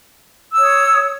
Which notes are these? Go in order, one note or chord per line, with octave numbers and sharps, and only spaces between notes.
C#5 D#6 E6